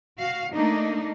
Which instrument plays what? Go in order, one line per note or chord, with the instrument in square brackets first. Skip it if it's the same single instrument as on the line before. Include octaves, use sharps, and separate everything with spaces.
[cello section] F#4 F5
A3 A#3 D4 D#4